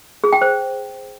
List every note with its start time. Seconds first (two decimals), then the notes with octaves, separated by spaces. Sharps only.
0.24 G#4
0.33 G5
0.42 C5